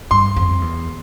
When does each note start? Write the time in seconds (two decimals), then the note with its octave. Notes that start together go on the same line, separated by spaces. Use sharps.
0.11 G2 C6
0.36 F2
0.61 E2